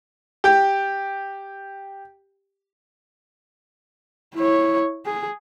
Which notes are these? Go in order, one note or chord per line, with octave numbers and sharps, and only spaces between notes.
G4 G5
E4 C#5
G#4